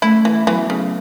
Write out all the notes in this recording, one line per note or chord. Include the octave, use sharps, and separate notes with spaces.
A3 C#4 E4
E3
E3 F#3 B3
C#3